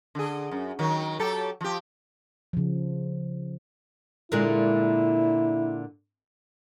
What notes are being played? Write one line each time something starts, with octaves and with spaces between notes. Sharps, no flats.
D3 G#4
F#2
D#3 F#3
F#3 G4 A4
F3 G4
C#3 F3
A#2 D3 G#3 E4